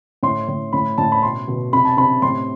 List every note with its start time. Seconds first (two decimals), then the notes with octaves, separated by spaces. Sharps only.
0.23 A2 C6
0.48 A2
0.73 A2 B5
0.98 A2 A5
1.12 B5
1.23 B2 C6
1.48 B2
1.73 C3 B5
1.85 A5
1.97 C3 B5
2.22 A2 C6